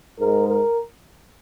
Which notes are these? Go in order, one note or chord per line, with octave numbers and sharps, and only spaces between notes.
G#2 G#3 A#4
A#4